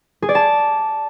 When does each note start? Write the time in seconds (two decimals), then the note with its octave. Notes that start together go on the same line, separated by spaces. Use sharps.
0.22 G#4
0.29 D5
0.35 A5